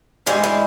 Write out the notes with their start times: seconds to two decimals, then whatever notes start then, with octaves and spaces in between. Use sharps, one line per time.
0.26 G2 E3 G3 G#3
0.44 G#3